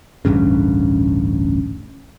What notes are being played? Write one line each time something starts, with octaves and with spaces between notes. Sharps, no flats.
D1 A1 G2 C#3